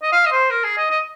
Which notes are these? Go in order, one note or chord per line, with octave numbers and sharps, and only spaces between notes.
D#5
F5
D#5
C5
A#4
G#4
D#5
D#5